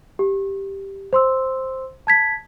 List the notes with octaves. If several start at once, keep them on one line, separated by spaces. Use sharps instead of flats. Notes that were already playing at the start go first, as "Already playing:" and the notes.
G4
C5 C6 E6
A5 G#6 B6